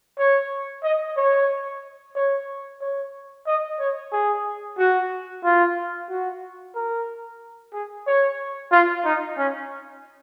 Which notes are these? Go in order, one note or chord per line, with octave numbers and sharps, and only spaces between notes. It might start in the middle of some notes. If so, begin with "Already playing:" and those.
C#5
D#5
C#5
C#5
C#5
D#5
C#5
G#4
F#4
F4
F#4
A#4
G#4
C#5
F4
D#4
C#4